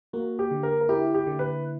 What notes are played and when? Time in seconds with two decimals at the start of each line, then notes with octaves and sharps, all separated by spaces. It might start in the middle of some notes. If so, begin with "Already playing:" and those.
0.13 A#3 F#4
0.39 G4
0.51 D3
0.63 A#4
0.81 A#4
0.89 E4 G4
1.14 G4
1.27 D3
1.39 B4